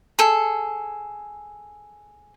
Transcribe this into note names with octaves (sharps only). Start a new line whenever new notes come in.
G#4 A4